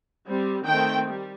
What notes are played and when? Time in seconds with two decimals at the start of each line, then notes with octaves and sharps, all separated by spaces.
0.27 G3 C4
0.66 D#3 A3 C4 G5
1.06 G3